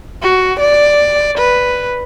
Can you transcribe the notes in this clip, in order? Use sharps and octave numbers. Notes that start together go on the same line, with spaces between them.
F#4
D5
B4